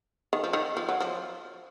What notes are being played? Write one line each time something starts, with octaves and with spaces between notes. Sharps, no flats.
D#3
F3
D#3
F3
F#3
F3